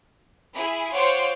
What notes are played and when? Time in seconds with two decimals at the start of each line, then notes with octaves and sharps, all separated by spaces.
0.55 E4 G#4 B5
0.92 F4 C5 C#5 F#5 G5 D6